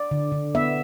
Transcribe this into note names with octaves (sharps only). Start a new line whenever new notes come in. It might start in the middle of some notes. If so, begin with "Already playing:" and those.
Already playing: D5
D3
D3
B3 E5